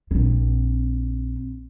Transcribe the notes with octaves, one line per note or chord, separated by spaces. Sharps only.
A#1 C4